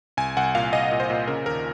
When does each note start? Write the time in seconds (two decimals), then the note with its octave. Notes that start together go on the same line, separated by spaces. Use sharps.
0.17 C2 G#5
0.37 C2 F#5
0.55 A#2 F5
0.73 C2 D#5
0.91 A#2
1.00 C5
1.10 A#2
1.27 C#3 A#4
1.46 D#2 A#4